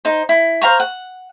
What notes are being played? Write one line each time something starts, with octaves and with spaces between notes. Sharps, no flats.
D#4 C5
E4
C5 F5 A#5 C#6
F#5